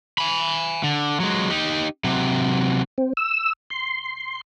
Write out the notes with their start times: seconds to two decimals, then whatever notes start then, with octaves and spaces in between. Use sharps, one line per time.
0.18 G#5 B5
0.83 D3
1.20 F#3 G#3
1.51 D#4 G4
2.04 C3 F#3
2.98 C4
3.17 E6
3.70 C6